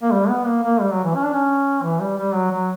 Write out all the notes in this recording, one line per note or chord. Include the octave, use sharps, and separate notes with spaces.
A#3
G3
B3
A#3
A#3
G3
F#3
E3
C#4
D4
C#4
E3
G3
G3
F#3
F#3